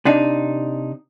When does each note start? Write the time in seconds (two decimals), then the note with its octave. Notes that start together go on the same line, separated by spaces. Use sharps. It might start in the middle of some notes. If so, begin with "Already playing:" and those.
0.05 C3 D4 D#4